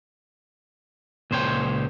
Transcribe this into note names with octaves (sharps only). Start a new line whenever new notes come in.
C#2 A#2 C5 C#5 G5